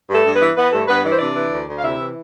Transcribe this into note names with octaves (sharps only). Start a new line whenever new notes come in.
G2
A3 A4
G2
B3 B4
E3
E3 B3 B4
G2 A3 A4
G2 B3 B4
E3 D5
C5
C3 D4 D5
E3
D2
D2
F5
C3 E4 E5
E3